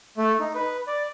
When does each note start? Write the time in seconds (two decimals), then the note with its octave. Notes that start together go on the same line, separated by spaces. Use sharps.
0.18 A3
0.39 D#4
0.55 B4
0.87 D5